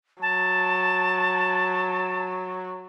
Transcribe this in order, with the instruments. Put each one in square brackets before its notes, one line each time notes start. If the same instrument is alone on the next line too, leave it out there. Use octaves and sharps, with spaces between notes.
[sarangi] F#3 [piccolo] A5